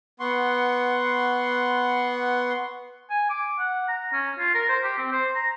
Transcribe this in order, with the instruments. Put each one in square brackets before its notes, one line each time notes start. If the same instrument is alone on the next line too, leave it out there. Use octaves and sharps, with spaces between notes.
[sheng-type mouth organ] B3 F#5 C6 C#6
[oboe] G#5
D6
F#5
A#5
C#4
F4
A#4
C5
G4
C4
C5
A#5